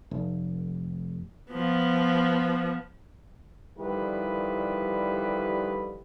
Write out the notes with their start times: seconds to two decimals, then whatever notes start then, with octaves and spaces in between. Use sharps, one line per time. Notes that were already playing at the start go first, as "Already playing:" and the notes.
0.11 F1
1.52 F3 B3
3.78 D3 D#3 F3 G3 E4 B4